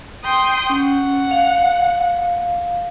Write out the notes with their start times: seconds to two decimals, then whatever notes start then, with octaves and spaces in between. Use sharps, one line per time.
0.24 G5 C6 D#6
0.70 C#4 F#5
1.31 F5